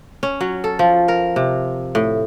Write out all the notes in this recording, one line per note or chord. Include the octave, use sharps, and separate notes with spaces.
C#4
F#3
A4
F3
A#4
C3
A2